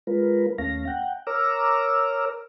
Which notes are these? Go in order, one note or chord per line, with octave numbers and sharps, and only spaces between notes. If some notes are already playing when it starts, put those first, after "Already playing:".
G#3 F4 A#4 B4
D#2 A3 C#4 F5 A#6
F#5 G5
A#4 C#5 A#5 D6 E6 F6